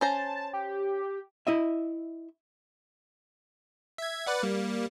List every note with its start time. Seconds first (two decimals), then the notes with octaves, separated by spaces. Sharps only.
0.01 C#4 C5 A5 A#5
0.53 G4
1.47 E4 D#5 E5
3.98 E5 G#6
4.27 B4 D5 F#5
4.43 G3 A#3